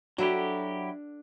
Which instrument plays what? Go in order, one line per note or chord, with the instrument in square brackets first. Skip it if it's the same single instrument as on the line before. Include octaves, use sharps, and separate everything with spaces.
[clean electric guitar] F#3 E4 G4 [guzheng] D4 A4 [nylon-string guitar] F#4